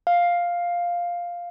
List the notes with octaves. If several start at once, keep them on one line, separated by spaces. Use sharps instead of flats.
F5